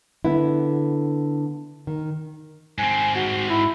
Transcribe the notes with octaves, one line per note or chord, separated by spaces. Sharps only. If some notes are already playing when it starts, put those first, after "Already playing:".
D3 B3 E4
D#3
G#2 C4 G#5
F#4
E4